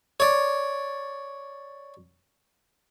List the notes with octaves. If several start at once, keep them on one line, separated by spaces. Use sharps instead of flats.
C#5 D5